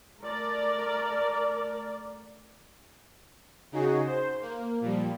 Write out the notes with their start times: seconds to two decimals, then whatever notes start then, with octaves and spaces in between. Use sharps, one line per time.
0.20 A3 A#4 D5
3.72 C#3 D#4 F#4 G#4
4.07 C5
4.41 A#3
4.80 A#2 F3 G3